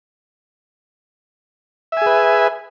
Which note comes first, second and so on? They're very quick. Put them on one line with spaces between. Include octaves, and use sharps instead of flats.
E5 G#5 G#4 B4